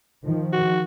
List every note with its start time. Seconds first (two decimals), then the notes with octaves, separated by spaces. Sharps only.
0.25 D#3 F3
0.53 F#4